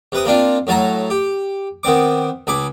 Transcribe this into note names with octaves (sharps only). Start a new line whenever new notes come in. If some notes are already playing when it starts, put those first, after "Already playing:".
C3 B4 D#6
A#3 C4 D4 F4
A2 F#3 A4 A5 A#5
G4
D#3 B3 C4 D6
C#2 G#4 B5 D6